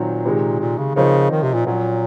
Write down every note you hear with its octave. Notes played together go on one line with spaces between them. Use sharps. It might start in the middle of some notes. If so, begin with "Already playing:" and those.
Already playing: A#2 D#3 F#3 C4
C3 D#3 G#3
A#2
C#3
C#3 F3 C4 D#4 A#4 C#5
D#3
C3
A#2
A#2 F#3 C#4 F#4